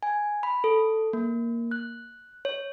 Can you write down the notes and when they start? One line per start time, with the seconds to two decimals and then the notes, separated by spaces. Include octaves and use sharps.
0.03 G#5
0.43 B5
0.64 A4
1.13 A#3
1.71 F#6
2.45 C#5